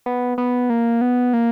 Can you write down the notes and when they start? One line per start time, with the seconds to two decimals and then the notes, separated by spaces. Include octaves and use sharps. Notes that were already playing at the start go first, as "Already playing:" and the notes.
0.06 B3
0.38 B3
0.70 A#3
1.01 B3
1.33 A#3